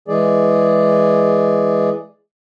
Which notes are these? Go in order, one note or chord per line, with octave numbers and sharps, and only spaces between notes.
E3 G#3 G#4 D5